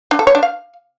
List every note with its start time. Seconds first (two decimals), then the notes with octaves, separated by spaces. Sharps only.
0.11 D4
0.19 A4
0.27 C#5
0.35 D4
0.43 F5